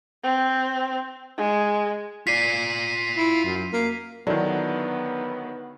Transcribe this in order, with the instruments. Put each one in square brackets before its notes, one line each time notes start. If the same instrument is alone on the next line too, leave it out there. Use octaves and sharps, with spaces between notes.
[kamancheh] C4
G#3
[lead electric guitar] F4 D5 [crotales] B6 C7 D#7
[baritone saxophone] E4
F#2
A#3
[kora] D3 E4 [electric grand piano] D#3 F#3 [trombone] B3